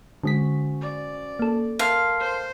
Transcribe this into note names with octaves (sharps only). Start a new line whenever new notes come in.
D3 G#3 C#4 F#4 C5 B6
D5
A#3 A4
A#4 F5 A5 C6
C5